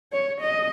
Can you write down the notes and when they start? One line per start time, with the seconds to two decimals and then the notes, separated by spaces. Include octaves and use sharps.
0.13 C#5
0.41 D#5